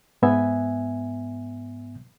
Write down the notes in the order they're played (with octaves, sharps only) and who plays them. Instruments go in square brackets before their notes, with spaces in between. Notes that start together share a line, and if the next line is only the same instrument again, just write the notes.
[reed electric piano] G#2 B3 E5 G#5